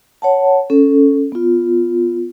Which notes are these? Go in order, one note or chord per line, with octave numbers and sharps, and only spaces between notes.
C#5 F#5 A5
C#4 A4
B3 F4